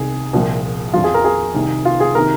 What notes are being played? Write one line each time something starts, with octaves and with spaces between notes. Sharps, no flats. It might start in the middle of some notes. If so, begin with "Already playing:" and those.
Already playing: C2 C3 D#3 G#4
C2 A#2 F3
F2 F3 F4
G#4
A#4
G#4
C2 C3 D#3
F4
G#4
C3 D#3 A#4